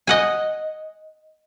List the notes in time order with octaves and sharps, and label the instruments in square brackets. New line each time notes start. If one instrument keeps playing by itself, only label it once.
[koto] D#5 F#5 G#5